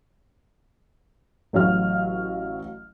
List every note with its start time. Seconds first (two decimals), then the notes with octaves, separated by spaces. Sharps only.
1.53 A1 F#3 F5 F6